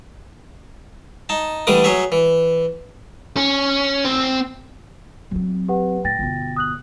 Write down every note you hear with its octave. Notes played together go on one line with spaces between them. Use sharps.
D#4 A5
D3 E3 G3 A3 D6 D#6
F#3 G#4 C#5 E5
E3
C#4
C4
F#3 C4
G4 B4 F#5
A2 G5 A6 A#6
G1 B2
D#6 F#6 F#7